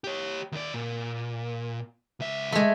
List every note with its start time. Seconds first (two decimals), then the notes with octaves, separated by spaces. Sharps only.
0.04 G4 C#5
0.52 D#2 D5
0.74 A#2
2.20 C#2 E5
2.52 G#3 A3